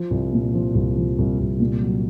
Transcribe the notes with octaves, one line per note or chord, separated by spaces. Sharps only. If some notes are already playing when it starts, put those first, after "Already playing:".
Already playing: F3
C2
A#2
F3
C2
F3
C2
C2
A#2
F#3